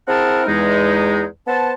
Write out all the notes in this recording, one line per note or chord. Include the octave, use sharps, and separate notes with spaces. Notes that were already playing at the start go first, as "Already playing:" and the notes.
C4 E4 G#4 A#4 F#5 A5
E2 G#3 D#4
B3 C5 F#5 A5